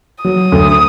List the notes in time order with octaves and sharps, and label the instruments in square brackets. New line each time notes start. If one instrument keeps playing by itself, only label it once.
[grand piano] F#3 [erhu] D#6
[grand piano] D2